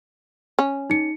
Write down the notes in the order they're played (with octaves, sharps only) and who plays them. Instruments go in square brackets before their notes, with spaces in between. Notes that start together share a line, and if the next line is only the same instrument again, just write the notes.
[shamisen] C#4
[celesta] D#4 C#7